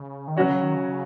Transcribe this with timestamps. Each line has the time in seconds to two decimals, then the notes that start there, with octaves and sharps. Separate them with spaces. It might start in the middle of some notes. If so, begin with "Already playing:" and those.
Already playing: C#3
0.28 D#3
0.36 E3 F#3 C#4 F#4 C#5
0.49 C#3
0.62 D#3
0.75 C#3
0.88 C#3